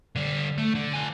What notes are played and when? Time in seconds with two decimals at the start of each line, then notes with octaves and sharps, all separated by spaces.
0.16 D3 G3
0.58 A3
0.75 D3
0.94 F3 G#5